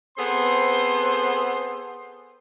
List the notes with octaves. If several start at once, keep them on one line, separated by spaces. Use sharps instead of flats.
B3 C4 G#4 A4 C5 C6